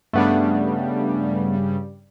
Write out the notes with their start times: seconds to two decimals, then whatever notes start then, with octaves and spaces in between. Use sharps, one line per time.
0.13 G2 C#3 G3 A3 B3 D4